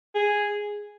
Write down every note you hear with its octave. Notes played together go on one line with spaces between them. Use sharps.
G#4